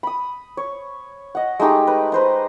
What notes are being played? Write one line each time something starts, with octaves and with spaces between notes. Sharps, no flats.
B5 D#6
C#5
D#5 F#5
G#3 A3 D#4 G4
B4
B4 C5 A#5